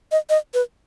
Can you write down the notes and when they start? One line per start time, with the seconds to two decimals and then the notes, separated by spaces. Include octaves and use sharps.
0.12 D#5
0.30 D#5
0.54 B4